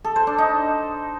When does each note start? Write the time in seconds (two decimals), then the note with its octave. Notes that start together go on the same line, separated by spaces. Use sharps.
0.04 A4
0.16 C5
0.27 D4
0.38 D#4